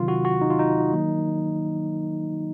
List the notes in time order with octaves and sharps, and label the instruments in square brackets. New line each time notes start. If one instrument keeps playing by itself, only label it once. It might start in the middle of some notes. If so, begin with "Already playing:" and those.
Already playing: [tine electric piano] C3 D#3 F#3 F4
F#4
F#4
D#4
F4
D#4
D#3 F#3 A#3